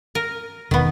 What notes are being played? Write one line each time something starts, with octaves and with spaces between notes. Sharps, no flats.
A#4
E1 D#3 B3